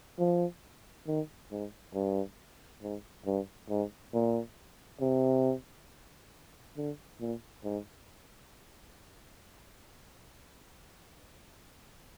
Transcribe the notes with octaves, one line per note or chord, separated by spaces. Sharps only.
F3
D#3
G#2
G2
G#2
G2
G#2
A#2
C3
D3
A#2
G#2